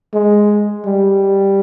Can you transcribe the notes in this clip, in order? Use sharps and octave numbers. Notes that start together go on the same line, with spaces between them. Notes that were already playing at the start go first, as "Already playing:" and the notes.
G#3
G3